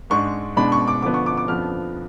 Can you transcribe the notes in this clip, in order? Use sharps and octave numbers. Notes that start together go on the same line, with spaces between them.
G#2 G#3 D4 C#6
B2 G#3 D4 B5
C#6
D6
D3 F3 B3 D4 D6
C#6
D6
D6
F2 F3 B3 D4 F6